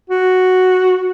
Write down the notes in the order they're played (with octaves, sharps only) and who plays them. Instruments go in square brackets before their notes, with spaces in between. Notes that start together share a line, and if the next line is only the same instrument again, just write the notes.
[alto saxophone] F#4